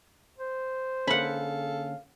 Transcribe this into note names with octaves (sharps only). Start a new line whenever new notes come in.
C5
D3 A#3 C#4 G#4 A4 F5 F#5 B5